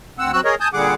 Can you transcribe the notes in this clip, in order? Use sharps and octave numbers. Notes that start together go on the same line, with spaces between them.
D2 C4 F#5 E6
F#3 C4 F#4 E6 F#6
G#4 A#4 C#5 D#5
G#5 A5 D#6 G6
A#2 D3 G3 G#4 F#5 D6